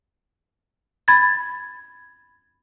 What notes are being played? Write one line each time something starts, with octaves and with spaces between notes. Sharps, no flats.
B5 G#6 A6